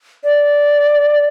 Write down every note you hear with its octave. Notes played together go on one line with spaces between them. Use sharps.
D5